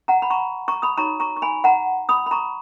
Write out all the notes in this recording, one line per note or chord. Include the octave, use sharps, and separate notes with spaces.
F#5 A#5
B5
A#5 C#6
A#5 C#6
B5 D#6
D#4 F#4 C#5 A#5 C#6
A#5 C#6
C#6
G#5 B5
F#5 A#5
B5 D#6
B5
A#5 C#6